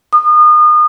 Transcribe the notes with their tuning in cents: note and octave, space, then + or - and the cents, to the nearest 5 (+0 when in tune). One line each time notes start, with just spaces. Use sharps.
D#6 -35